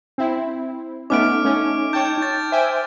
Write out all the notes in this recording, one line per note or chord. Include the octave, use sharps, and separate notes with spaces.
C4 E4
A3 B3 C#4 D#4 D6 F6 D7
A3 C#4
C#5 G5 A5 G6
A6
C5 E5 G5 G#5